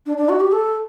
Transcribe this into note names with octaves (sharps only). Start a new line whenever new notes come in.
D4
D4
F#4
G4
A4